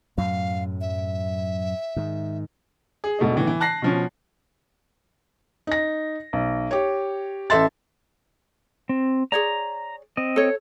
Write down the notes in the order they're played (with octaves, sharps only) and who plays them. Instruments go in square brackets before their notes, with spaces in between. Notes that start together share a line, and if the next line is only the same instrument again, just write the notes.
[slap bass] F#2 A2 F#3 [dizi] F5
[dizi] E5
[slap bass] G#2 D#3
[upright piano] G#4
E1 B2 A3 D#4
A2 E3
E3
A5 F#6 A#6 C7
B2 F3 C#4
[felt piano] D#4 A#6
B1
G4 C#5
A1 A4 E5 C6 A6
[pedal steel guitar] C4
[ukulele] G#4 C#5 D5 [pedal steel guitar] A#5
[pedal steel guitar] C4 D#5
[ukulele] A4 C#5